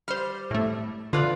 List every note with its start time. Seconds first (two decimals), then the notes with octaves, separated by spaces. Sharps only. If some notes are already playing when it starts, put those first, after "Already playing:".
0.08 G3 C5 F6
0.51 A2 A3
1.13 D3 F4 B4 D5